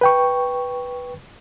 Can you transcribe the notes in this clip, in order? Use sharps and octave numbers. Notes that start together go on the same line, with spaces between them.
B4 G5 C#6